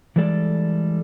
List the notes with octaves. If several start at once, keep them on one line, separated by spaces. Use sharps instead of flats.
E3 G3 G#3 A4 D5